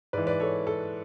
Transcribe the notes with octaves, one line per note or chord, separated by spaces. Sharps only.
G#2 E3 B4 D5
B4 D5
A4 C#5
A4